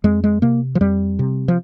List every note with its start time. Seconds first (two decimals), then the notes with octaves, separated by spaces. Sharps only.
0.04 F2 G#3
0.24 G#3
0.42 C3 A#3
0.75 F3
0.81 F2 G3
1.19 C3
1.48 F3